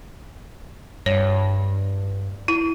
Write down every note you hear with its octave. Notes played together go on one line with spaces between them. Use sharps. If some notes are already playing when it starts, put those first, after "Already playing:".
G2 C#5
E4